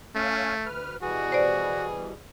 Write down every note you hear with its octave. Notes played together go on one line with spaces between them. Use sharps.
A3 C#4 F5 G#5
D2 B4 F6
B2 E3 G3 F#4 G#4
C5 D5